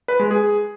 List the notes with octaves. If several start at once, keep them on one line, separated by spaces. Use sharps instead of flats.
B4
G#3
G#4